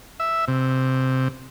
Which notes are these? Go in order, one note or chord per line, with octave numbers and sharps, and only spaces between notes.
E5
C3